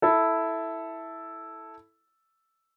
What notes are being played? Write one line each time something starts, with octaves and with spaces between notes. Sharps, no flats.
E4 A4